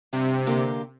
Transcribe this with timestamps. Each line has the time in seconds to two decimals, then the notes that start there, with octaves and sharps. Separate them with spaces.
0.13 G2 C3
0.46 D3 A#3 G4